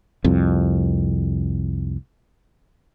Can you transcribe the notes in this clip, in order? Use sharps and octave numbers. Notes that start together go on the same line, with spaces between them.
C2 F2